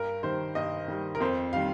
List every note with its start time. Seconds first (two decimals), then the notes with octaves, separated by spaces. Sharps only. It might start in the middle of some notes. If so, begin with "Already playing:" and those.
Already playing: G2 A#4
0.23 D#3 G3 C5
0.55 G2 D#5
0.88 D#3 G3
1.15 A#4
1.20 F2 C5
1.53 D#3 G3 F5